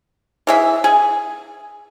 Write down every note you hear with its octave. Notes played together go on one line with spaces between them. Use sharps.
E3 G#4 E5
G#4